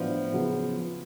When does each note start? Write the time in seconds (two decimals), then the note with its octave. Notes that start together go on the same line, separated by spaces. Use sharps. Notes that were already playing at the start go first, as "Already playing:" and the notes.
Already playing: A2 F3 F#3 B3 D4
0.32 C#3 F#3 B3 F#4